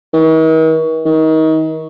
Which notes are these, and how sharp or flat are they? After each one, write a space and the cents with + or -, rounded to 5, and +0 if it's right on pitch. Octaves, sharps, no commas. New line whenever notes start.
D#3 +45
D#3 +30